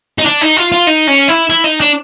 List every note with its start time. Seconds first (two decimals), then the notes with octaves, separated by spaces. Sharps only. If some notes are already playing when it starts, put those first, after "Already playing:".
0.19 D#4
0.26 D4
0.41 D#4
0.57 F4
0.72 F4
0.87 D#4
1.08 C#4
1.29 E4
1.50 E4
1.64 D#4
1.80 D4